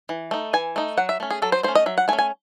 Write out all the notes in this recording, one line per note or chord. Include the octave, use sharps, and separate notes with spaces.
E3
A3 D#4
E3 G#5
A3 D#4
F#3 F#5
E5
A3 C#4
G#4
F#3 A4
C5
A3 C#4 C5
D#5
F#3 E5
F#5
A3 G#5
C#4
G#5